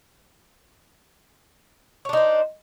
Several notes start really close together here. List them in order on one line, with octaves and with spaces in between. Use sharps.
C#5 D4 D#4 C5